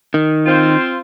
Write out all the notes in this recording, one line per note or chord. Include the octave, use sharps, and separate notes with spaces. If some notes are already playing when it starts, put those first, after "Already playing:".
D#3
C4 F4 C5